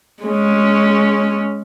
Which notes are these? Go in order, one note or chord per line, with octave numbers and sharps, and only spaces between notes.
G#3 C#4